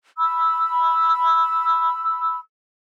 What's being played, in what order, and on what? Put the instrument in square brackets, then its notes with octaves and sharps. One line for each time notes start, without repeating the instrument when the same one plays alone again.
[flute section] B5 E6